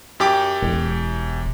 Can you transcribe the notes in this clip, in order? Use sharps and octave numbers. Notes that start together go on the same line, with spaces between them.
F#2 G4 D6
E1